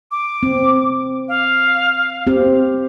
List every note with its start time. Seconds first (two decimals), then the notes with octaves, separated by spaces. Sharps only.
0.11 D6
0.43 C4
1.28 F5
2.27 C4 G4